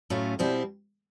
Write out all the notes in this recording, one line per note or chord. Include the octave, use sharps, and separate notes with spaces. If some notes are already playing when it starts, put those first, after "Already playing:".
A2 F#3 A3 C#4 F4
B2 G3 C4 E4